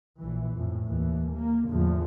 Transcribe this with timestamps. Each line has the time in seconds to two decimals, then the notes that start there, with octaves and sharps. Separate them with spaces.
0.18 A#1 E3
0.54 F2 A2
0.85 D#2 E3
1.32 A#3
1.69 E2 A2 D3 F3